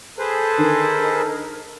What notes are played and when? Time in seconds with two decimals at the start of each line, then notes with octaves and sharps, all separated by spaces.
0.19 G#4 A4 B4 C5
0.58 D3 D#3 D#4 A#4